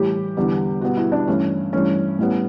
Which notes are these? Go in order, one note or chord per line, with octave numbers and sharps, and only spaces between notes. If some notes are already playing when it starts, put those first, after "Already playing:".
Already playing: A2 E3 G3 G4
E2 D3 G3 B3
B2 G3 B3 F#4
E4
D4
G2 E3 A3 C#4
G2 E3 A3 C#4
A2 G3 B3